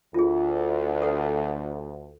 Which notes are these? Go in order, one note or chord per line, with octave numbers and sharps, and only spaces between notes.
D2 F4 G#4
A4 B4 F#5